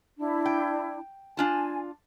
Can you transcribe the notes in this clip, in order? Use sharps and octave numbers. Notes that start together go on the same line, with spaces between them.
D4 E4
G5
D4 F4 G#5 A5